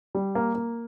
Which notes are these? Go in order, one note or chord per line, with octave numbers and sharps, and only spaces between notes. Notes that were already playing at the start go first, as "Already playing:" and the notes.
G3
A#3
A#3